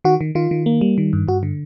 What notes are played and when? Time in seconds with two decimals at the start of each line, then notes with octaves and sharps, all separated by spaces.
0.04 D#3 F#4
0.21 D#3
0.35 D#3 F4
0.51 D#3
0.66 A#3
0.81 G3
0.98 D#3
1.13 G2
1.28 G2 F#4
1.43 D3